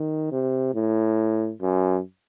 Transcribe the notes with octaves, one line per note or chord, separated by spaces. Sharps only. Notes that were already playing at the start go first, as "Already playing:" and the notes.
Already playing: D#3
C3
A2
F#2